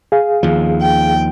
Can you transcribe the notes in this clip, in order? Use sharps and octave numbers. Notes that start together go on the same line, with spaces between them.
G#4 F5
D#2 F3
G5